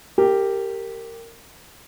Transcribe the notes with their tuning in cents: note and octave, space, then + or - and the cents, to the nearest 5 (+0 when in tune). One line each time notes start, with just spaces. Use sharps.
G4 +0 A#4 -20